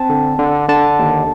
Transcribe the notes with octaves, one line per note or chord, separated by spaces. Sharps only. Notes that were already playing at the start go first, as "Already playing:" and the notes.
Already playing: C4 A5
D3
D3
D3 A5
D#2